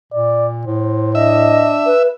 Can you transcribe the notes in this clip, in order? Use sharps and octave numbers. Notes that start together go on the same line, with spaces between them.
A#2 D5
A2 C5
D4 D#5 E5
B4